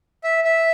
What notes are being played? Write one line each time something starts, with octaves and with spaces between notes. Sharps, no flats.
E5
E5